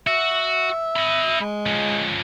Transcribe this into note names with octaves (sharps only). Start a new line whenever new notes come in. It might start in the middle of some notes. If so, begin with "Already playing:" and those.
F#4 E5
D#5 B5
G#3
F3 C#4